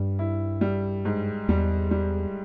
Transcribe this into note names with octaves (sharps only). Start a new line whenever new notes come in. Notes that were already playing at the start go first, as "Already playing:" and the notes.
Already playing: G2 G3
E4
G3
G#2
E2 G3
G3